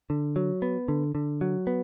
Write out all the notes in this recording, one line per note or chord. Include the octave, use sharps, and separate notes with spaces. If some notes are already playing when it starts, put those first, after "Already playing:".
D3
F#3
B3
D3
D3
F#3
B3